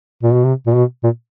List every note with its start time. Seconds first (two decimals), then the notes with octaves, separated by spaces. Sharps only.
0.23 A#2
0.34 B2
0.44 C3
0.66 A#2
0.75 B2
1.03 A#2